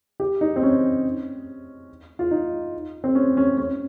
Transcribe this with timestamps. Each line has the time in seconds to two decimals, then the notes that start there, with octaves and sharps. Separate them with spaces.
0.20 G4
0.41 D#4
0.56 C4
0.63 C#4
2.19 F4
2.31 D#4
3.04 C4
3.15 C#4
3.37 C#4
3.57 C#4